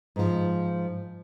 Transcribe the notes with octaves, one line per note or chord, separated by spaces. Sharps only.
G#2 F3